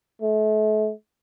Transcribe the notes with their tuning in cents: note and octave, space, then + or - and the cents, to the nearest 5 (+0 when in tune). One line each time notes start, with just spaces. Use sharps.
A3 -40